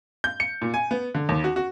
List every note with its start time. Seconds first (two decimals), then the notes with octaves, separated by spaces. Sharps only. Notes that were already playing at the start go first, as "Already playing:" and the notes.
0.24 G6
0.40 C#7
0.62 A#2
0.74 G#5
0.91 B3
1.14 D3
1.29 D#2
1.44 F#4
1.56 F#4